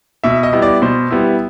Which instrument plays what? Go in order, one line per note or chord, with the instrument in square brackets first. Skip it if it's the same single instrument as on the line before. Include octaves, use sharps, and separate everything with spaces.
[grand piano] B2 E5
D#5
G3 B3 E4
D5
B2 C5
G3 B3 E4